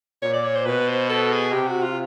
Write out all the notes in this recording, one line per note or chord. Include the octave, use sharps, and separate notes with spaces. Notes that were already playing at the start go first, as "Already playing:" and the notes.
A#2 C#5
D5
C#5
C5
B2 B4
C5
A4
G#4
C3 G4
F#4
F4